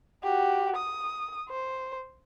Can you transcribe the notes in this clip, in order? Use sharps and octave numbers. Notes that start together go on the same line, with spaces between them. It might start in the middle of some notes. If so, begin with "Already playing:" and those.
F#4 G4
D#6
C5